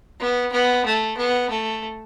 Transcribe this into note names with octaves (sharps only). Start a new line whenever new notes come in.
B3
B3
A3
B3
A3